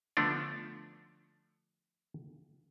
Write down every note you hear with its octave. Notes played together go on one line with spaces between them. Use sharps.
D3 F3 A3 B3 D4